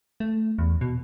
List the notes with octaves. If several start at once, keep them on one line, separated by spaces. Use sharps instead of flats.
A3
E2
B2